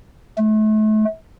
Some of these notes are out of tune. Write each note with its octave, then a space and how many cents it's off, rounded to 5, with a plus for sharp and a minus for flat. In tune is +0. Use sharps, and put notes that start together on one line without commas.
A3 -35